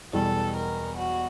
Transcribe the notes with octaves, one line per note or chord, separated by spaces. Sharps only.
E2 B2 G3 A4
A#4
F#4